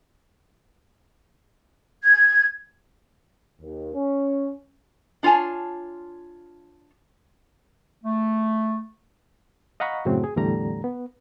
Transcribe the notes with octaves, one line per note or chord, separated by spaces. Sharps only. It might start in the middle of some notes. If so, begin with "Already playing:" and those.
G#6
D#2
C#4
D4 F4 C#5 G#5 A5
A3
D#5 F5 F#5 A#5 B5 C#6
F#2 A2 C#3 F#3 C4
G#4
E2 A2 D3 G3 A#5
B3